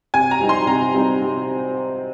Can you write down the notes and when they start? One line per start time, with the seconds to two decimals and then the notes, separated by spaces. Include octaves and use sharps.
0.14 C3 G#5
0.31 A#5
0.40 G3 C4 D#4
0.49 C6
0.67 C3 A#5
0.94 G3 C4 D#4
1.21 C3